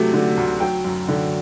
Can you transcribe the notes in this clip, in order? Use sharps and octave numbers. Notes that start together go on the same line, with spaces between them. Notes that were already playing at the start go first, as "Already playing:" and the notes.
Already playing: C3 F#3 A3
D3
D2
F#3 G5
F#2
D3